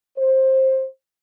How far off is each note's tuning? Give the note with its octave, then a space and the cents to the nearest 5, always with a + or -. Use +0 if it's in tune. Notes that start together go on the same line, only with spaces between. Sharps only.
C5 +15